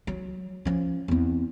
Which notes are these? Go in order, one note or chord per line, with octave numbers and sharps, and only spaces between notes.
F#3
F3 C#4
E2 C4